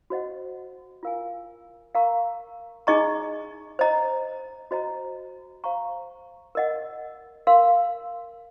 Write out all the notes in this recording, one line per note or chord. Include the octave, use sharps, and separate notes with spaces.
F#4 C5 D#5 F#5
F4 A#4 F5 G#5
A#4 F5 A#5 C#6
D#4 G#4 D#5 A#5 C#6
C5 D#5 A#5
F#4 C5 D#5 A#5
C5 F5 A#5 C#6
A#4 D#5 F#5
A#4 F5 C6